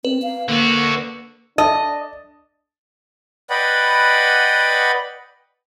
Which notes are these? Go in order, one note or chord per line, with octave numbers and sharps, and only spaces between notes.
C4 B4
F5
D3 A#3 F#4
D4 D#5 A5
B4 D5 D#5 F#5 G5 B5